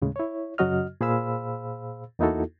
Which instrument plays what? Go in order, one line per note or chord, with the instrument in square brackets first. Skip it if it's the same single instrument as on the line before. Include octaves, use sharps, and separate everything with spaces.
[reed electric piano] D#2 A2 C#3 G#3
E4 C#5
F#2 C#3 F#3 F#4 D#5 F6
A#2 G#4 C5 F5 B5 E6
E2 A#3 D#4 E4 F#4 A4